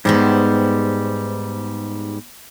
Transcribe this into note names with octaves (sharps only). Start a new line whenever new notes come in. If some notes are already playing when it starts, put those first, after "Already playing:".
G#2 G3 B3 G4 C5